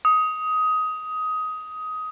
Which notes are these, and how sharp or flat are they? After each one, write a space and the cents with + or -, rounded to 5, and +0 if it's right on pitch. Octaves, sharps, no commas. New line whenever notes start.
D#6 +15